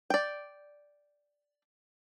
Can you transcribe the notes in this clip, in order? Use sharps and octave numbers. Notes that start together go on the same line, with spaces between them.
D5 G5